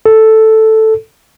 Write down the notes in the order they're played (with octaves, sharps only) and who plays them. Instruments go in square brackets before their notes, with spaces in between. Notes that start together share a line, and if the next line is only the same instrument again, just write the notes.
[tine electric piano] A4